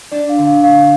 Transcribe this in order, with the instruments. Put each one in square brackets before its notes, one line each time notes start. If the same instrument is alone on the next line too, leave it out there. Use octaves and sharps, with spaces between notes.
[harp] D4 [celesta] D5
[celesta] F5
[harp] D3
[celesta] F5
[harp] A3 [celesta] F5